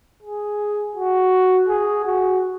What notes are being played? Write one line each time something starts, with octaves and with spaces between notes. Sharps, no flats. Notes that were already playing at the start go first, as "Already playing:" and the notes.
G#4
F#4
G#4
F#4